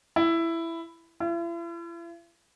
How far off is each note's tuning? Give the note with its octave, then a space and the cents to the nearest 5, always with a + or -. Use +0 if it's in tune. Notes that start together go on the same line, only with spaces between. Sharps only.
E4 +10
E4 +45